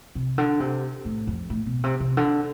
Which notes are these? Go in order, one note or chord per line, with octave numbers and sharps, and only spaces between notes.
C3
D3
C3
A2
F2
A2
B2
C3
C3
D3